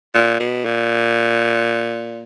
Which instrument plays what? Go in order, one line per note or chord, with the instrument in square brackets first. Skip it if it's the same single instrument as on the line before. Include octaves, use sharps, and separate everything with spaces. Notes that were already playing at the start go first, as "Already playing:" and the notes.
[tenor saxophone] A#2
B2
A#2